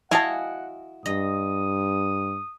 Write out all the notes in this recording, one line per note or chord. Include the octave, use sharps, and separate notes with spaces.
E4 F#4 D#5 F5 F#5 G#5 A5
G2 D#5 D#6